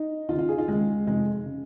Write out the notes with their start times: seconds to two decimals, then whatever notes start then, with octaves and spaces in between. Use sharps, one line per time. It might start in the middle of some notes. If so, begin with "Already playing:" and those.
Already playing: D#4
0.29 D#2 F4
0.33 C#3
0.39 F4
0.49 G#4
0.58 F4
0.68 D#2 C#3 G#3
1.06 F1 F2 D#3 G#3
1.46 C#3